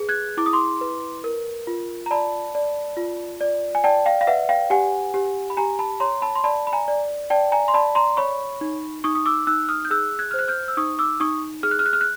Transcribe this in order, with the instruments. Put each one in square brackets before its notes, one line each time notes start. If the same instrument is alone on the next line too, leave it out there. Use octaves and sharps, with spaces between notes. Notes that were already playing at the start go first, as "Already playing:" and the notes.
Already playing: [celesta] G#4 B4
F#6 G#6
E4 D6
D#6
C6 D6
B4
A#4
F4
A#5
D5 A5 B5
D5
F4
D5
G#5
D5 G5 A5
F5 G5
F5
B4 E5 F#5
F5 G5
G4 F#5 G#5
G4
B5
G4 G#5 A#5
A5 B5
C#5 A#5 C6
A5 B5
C6
D5 A5 B5
B5
G#5 A#5
D5
D5 G5 A5
G#5 A#5
C6
D5 A5 B5
A#5 C6
C#5 B5 C#6
D#4
D#4 C#6 D#6
D#6
D6 E6
D#4 E6 F#6
D#6 F6
G6
G#4 E6 F#6
F#6 G#6
C5 F6
F#6
F6 G6
E6
D#4 C#6 D#6
D6 E6
D#4 C#6 D#6
G#4 F6
F#6
F6
F#6
F6
F#6